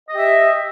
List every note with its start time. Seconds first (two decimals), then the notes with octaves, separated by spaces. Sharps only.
0.09 D#5
0.13 G4
0.17 E5